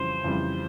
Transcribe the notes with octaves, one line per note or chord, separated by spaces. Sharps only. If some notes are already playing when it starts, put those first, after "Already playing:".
Already playing: F2 C#3 E3 G3 C5
F2 C#3 E3 G3